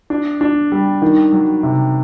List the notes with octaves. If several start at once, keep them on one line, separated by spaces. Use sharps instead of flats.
D4
D4
G3
D#3
F#3
C3